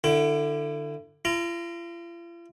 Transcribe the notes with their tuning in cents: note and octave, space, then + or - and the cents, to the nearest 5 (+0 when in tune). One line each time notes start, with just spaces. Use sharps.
D3 +20 E4 +35
F4 -45 A#5 +0